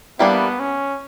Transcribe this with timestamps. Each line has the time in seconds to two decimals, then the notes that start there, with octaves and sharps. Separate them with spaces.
0.19 E3 G3 A#3 B3 D4
0.59 C#4